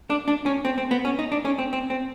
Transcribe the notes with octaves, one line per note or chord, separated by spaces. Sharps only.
D4
D4
C#4
C4
C4
B3
C#4
D#4
D4
C#4
C4
C4
C4